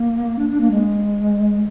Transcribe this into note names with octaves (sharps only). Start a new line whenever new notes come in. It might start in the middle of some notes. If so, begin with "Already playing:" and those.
Already playing: A#3
D4
D4
A#3
G#3